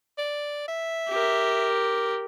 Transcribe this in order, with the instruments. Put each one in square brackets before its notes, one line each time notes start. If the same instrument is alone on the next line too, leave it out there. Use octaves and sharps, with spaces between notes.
[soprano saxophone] D5
E5
[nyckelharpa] G4 A#4